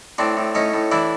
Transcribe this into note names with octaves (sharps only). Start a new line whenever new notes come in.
A2 C4 D4
A2
A2 C#4 D#4
A2
E3 D4 E4